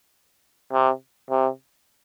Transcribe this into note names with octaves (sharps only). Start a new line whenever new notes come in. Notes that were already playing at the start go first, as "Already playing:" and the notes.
C3
C3